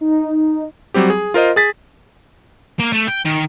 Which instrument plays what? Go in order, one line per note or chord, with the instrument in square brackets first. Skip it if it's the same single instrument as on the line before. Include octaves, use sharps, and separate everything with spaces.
[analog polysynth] D#4
[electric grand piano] F#3 G3 C4 G4
G#4
F4 A#4 C5 D#5
G#4 A6 B6
[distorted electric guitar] A#3
A3
G5
D#3